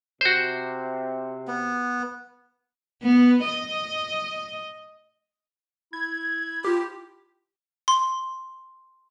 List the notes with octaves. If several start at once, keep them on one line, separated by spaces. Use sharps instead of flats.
C3 F#4 C5
B3
B3
D#5
E4 G#6
F4 G4
C6